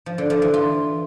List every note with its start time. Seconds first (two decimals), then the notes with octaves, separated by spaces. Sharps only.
0.06 F3
0.18 D3
0.30 F3
0.42 E3
0.54 F4